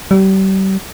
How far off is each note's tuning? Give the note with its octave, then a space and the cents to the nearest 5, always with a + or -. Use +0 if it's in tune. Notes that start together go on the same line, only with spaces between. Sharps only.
G3 -35